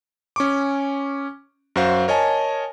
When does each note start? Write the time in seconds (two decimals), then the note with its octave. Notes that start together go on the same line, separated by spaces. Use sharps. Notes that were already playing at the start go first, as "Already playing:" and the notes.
0.36 C#4 C#6 D6
1.76 F#2 F#4 C5 F5
2.08 A#4 C#5 D#5 G#5 A5